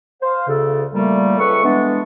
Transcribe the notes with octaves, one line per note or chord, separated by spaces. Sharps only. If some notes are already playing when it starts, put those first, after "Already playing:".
C5 F5
D2 C#3 A4
A#2 G3 A3 A#3
C#2 A3 A4 B4 C#6
E3 G#3 B3 D4